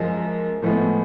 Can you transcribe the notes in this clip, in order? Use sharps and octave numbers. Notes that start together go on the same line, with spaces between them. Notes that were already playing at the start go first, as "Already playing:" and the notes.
Already playing: F#2 F3 G#3
A2 F3 G#3 B3